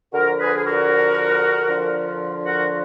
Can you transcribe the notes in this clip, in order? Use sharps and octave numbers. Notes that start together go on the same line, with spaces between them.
D3 F3 F#4 A#4
G#4 B4
G#4
F#4 A#4
D3 F3
F#4 A#4